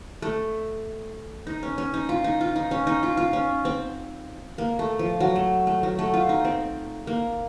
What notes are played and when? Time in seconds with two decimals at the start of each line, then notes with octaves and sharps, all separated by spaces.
0.22 A3
1.47 D#4
1.63 C#4
1.78 C#4
1.94 D#4
2.09 F4
2.24 D#4
2.41 F4
2.56 D#4
2.71 C#4
2.87 D#4
3.03 F4
3.17 F4
3.33 C#4
3.65 C4
4.58 A#3
4.79 A3
4.99 F3
5.20 F#3
5.36 A3
5.67 A3
5.83 F#3
5.99 A3
6.14 F4
6.29 D#4
6.45 C4
7.07 A#3